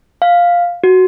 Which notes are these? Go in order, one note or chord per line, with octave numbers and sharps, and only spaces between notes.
F5
F#4